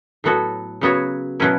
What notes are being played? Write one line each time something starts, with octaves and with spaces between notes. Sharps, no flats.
A2 F#3 B3 F#4 A4
C#3 F#3 B3 F#4 C#5
B2 F#3 C#4 E4